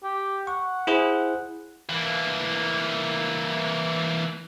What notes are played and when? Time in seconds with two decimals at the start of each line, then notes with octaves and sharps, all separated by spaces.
0.03 G4
0.47 F#5 C#6
0.87 E4 G#4 C5
1.89 E3 A#3